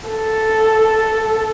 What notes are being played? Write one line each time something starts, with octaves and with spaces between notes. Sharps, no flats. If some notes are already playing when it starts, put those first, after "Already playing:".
A4